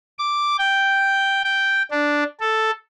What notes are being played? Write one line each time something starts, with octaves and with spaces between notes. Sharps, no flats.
D6
G5
G5
D4
A4